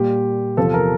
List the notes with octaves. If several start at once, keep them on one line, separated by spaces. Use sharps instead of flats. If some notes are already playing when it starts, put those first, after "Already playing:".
Already playing: A#2 G3 G4
E2 C3 F3 A4
A#4